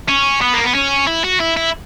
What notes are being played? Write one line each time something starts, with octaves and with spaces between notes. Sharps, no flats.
C#4
B3
A#3
B3
C#4
E4
F#4
E4
E4